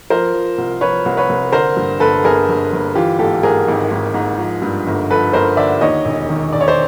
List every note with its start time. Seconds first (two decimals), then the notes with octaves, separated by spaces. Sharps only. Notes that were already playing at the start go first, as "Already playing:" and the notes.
0.10 F3 A#4 C5
0.34 F3
0.58 C2
0.81 F3 B4 C#5
1.06 C2
1.17 B4 C#5
1.29 C2
1.52 D3 A#4 C5
1.77 G2
2.00 G1 A4 B4
2.24 G1 G#4 A#4
2.49 G1
2.73 G1
2.95 E3 F4 G4
3.19 G#2 G4 A4
3.43 G#2 G#4 A#4
3.68 G#1
3.91 G#1
4.14 G#2
4.38 F3
4.62 G2
4.87 G1
5.10 F3 A4 B4
5.33 G1 A#4 C5
5.57 D3 D5 E5
5.81 D#2 C#5 D#5
6.05 E1
6.29 D#3
6.53 E1 D5
6.61 C#5
6.68 C5 D5